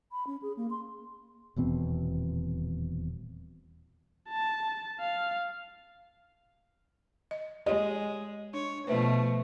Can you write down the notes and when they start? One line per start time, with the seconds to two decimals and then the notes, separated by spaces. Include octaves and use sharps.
0.12 B5
0.27 C#4
0.42 G#4
0.57 A#3
0.70 C6
1.56 D#1 E2 B2 C4
4.29 A5
5.00 F5
7.31 D#5
7.66 G#3 G4 C#5 D#5
8.54 D4 C#5
8.87 B2 F3 A3 B4 C5 E5